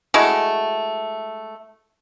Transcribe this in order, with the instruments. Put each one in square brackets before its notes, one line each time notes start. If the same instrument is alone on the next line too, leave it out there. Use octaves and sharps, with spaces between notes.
[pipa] G#3 A3 E4 F#4